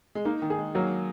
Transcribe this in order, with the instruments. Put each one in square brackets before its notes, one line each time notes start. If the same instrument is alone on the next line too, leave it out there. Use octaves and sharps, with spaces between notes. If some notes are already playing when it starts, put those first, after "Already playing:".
[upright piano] G#3
[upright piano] A#3 [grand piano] D#4
[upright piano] D#3
[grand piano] G#4
[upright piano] G#3
[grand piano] F#3 [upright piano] A#3